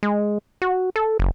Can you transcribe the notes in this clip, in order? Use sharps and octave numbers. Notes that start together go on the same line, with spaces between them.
G#3
F#4
A4
F#1